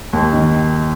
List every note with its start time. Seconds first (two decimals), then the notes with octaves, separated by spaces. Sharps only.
0.13 D#2
0.33 D#3